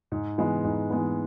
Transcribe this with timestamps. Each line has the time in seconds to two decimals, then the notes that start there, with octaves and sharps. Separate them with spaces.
0.12 G#2
0.38 E3 G#3 B3
0.64 G#2
0.90 E3 G#3 B3